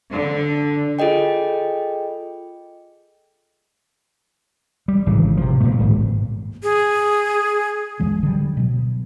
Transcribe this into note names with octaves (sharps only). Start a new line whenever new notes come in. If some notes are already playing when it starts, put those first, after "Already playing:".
D3
F4 G#4 A4 D#5 G5
G3
G#1 C#3 E3
C3 F3
G2 A#2 A3
D1 G#1 G#2
G#4
G#1 D#2 F3 G#3
D3 F#3 G3
B2 F#3